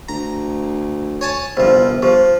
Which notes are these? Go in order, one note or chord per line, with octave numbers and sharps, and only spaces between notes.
D2 A#5
C#5 G#5 A5
G1 C2 F3 C5
F3 G4 C5